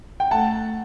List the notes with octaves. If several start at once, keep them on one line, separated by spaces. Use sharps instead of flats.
G5
A3 F#5 A5